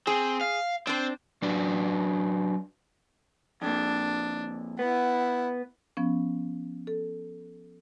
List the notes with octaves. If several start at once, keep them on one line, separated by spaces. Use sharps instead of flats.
C4 G#4
F5
C4 D4 C5
F#3 D4 F#4 B4 D5
F2 A#2 D4
B3 E4 F#5
F3 B3 C#4
A4